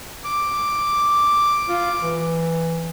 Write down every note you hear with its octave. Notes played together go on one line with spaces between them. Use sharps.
D6
F4
E3